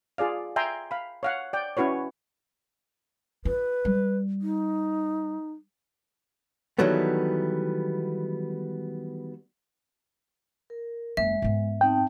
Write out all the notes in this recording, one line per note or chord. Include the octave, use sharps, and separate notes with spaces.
F4 G#4 D5 F5
E5 G5 G#5 A#5 C6
F5 B5
C#5 F5 F#5
D5 G5
C#4 E4 F#4 B4 C#5
F4 B4
G3
D#4
D#3 E3 F#3 G3 A3 B3
A#4
F#1 G#3 E5
G#2 B3
C4 D#4 G5 A5